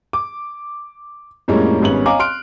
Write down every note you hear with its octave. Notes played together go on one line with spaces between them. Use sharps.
D6
F2 A2 G3 G#3 A#3 C#4
G#1 G3 B3 C#4 F#7
C#5 D#5 F5 G#5 A#5 D6
C6 F6 F#6 D7